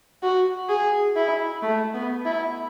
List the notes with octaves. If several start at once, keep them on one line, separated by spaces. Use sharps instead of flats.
F#4
G#4
E4
A3
B3
E4